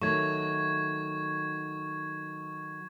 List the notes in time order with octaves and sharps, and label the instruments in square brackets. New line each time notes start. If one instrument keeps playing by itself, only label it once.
[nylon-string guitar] D#3 F#3 A3 [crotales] C#6 G#6